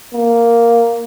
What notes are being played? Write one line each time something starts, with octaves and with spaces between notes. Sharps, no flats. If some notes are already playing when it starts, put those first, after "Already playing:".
A#3